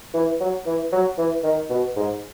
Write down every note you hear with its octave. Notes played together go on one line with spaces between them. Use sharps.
E3
F#3
E3
F#3
E3
D#3
B2
G#2